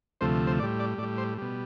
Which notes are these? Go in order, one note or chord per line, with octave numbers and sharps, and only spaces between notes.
D2 C3 F3 A3 C5
C5
A2 G3 D5
D5
A2 G3 D5
C5
B2 G3